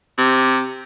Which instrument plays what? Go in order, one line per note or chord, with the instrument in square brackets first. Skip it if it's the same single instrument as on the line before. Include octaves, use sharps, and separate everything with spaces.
[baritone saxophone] C3